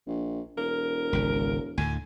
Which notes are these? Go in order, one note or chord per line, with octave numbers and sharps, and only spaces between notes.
A#1
E1 A#4
G#1 C#2
D2 A2 D3 G#5